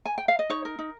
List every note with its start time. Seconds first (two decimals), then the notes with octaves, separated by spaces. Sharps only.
0.05 G#5
0.18 G5
0.28 F5
0.39 D#5
0.50 D#4 C#5
0.65 A#4
0.79 D#4